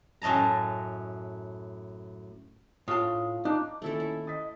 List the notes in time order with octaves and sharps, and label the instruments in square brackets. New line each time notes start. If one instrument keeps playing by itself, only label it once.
[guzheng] F#2 A2 D#5 A5 A#5
[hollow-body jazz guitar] A2 A5 [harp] F4 [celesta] D#6
[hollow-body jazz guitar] D4 [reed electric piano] D#4 [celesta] A#5 D6
[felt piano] A#2 D#3 [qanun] A3 E4 A4 [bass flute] C#4
[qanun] E4
[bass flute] D#5 [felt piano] D#6 A6 B6